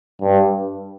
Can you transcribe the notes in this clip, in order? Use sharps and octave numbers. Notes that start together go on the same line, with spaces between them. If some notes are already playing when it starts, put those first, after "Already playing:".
G2